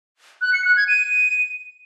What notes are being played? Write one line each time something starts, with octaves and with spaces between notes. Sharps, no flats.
F#6
C#7
F#6
G#6
D#7